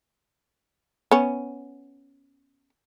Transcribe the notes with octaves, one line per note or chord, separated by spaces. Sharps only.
B3 C#4